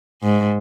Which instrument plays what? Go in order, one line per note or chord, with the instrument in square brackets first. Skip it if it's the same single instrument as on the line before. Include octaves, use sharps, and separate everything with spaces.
[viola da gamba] G#2